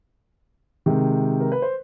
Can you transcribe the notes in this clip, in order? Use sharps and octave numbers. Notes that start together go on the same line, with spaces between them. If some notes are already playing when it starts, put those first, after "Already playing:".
C3 D#3 G#3
A#4
B4
C5